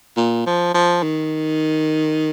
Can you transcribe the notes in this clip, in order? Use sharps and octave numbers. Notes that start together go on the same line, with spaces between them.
A#2
F3
F3
D#3